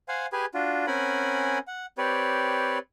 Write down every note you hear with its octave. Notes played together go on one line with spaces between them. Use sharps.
C5 F5 F#5 G#5
G4 G#4 B4 G#5
D4 F4 F#4
C4 C#4 A#4 F#5 G#5 B5
F#5
C4 G4 B4 C#5 D5